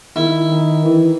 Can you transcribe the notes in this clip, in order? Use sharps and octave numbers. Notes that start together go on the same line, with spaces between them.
D#3 E4
D#3
E3